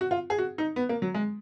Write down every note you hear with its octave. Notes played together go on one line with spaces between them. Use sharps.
F#4
F4
G#4
F#4
D#4
B3
A#3
F#3
G#3